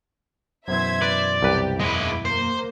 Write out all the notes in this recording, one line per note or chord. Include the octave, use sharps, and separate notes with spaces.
F#2 B2 E3 C5 E5 G#6
B4 D5
C2 G4 B4
E2 G#3 E4 B4 D#5 D6
A#3 C5